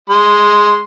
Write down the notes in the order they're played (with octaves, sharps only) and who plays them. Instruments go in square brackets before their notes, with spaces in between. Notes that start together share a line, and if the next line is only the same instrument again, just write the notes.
[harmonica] G#3 C6